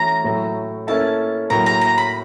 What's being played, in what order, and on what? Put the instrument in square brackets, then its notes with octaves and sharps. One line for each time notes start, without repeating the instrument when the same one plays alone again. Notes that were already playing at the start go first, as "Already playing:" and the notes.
Already playing: [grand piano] E3 A3 C#4 F#4 [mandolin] A#5
[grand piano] A2 F#3 A3
[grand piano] A#3 C#4 E4 A4 [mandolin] A5
[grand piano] A2 F#3 A#3 [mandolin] A#5
[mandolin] A#5
A#5
B5